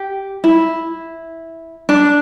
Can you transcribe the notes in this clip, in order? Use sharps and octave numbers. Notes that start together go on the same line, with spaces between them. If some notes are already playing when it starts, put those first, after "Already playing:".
Already playing: G4
E4
D4